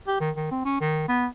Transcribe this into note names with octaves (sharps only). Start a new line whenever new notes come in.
G4
D#3
D#3
C4
C#4
D#3
B3